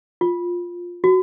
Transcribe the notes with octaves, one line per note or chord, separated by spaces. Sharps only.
F4
F#4